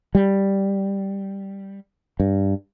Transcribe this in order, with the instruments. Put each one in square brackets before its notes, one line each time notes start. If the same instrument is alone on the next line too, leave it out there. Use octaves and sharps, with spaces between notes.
[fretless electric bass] G3
G2